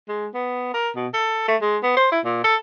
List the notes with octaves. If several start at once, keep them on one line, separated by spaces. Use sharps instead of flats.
G#3
B3
A#4
B2
A4
A3
G#3
B3
C5
E4
A#2
A4